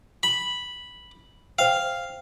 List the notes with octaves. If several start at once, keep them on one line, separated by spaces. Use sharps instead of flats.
B5
C5 F5 G5